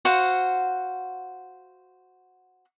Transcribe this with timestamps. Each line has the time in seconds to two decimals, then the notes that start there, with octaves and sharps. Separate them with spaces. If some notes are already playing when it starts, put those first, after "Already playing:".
0.05 F#4 C5 F5 F#5